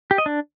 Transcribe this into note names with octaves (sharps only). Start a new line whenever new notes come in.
G4
D#5
D4